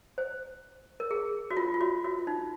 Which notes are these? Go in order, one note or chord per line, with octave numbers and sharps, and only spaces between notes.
C5
A#4
G#4
F#4
F4
F4
F#4
F#4
F4
D#4